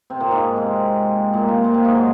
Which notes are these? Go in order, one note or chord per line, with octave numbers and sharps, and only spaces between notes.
C3 C4
A#2 A#3
G#2 G#3
C3 C4
A#2 A#3
C3 C4
A#2 A#3
C3 C4
G#2 G#3
F#3